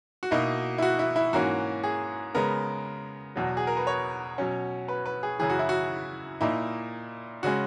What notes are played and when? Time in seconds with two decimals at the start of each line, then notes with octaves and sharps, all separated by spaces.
0.23 F#4
0.31 B2 A#3 D#4 E4
0.78 E4
0.82 F#4
0.99 E4
1.16 E4
1.33 G#2 E3 A#3 C#4 F#4
1.84 G#4
2.35 C#3 G#3 B3 A#4
3.36 E2 B2 F#3
3.57 G#4
3.67 A#4
3.77 B4
3.87 C#5
4.38 B2 F#3 C#4
4.88 B4
5.06 B4
5.23 G#4
5.39 F#2 C#3 E3 G#4
5.50 F#4
5.59 E4
5.69 F#4
6.41 A#2 A#3 D#4 E4
7.43 C#3 G#3 C#4 F#4